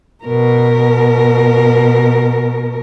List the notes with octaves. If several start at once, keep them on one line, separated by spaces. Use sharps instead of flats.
B2 A#4